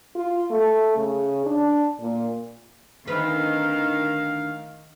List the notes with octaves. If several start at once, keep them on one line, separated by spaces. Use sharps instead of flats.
F4
A3
C#3
D4
A#2
D2 D#3 C4 B4 F5